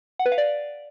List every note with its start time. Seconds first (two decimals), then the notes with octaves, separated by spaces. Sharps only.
0.19 F#5
0.26 B4
0.32 F5
0.38 D5